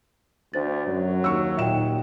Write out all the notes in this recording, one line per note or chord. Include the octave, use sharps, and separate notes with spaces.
D2 D4 C5 A6
F#2 F#3
D#2 C#6 E6
A#2 D#4 E5 G5 E7